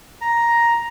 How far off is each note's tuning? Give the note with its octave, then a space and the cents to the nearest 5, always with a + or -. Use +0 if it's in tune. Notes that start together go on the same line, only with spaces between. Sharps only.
A#5 +5